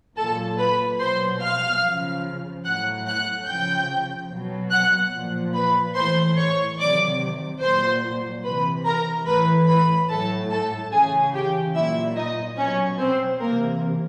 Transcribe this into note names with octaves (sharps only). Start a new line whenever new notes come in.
A#2 F#3 A4 A5
B4 B5
B2 F#3 C5 C6
F5 F6
C#3 F3
A2 F#3 F#5 F#6
F#5 F#6
C#3 F3 G5 G6
B2 F#3
F#5 F#6
A#2 F3
B4 B5
A2 E3 C5 C6
C#5 C#6
C3 D#3 F#3 D5 D6
A#2 F#3 C5 C6
C3 E3 B4 B5
A#4 A#5
A2 E3 B4 B5
B4 B5
A2 F#3 A4 A5
A4 A5
C#3 E3 G#4 G#5
G4 G5
A#2 F#3 E4 E5
D#4 D#5
B2 F#3 C#4 C#5
C4 C5
C3 E3 A#3 A#4